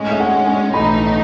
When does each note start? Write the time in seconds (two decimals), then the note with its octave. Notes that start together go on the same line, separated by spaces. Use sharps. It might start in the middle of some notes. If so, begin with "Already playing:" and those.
Already playing: A2 G#3 C#4
0.11 E5
0.20 F#5
0.46 G#5
0.73 B1 A2 E3 A3 D#4 B5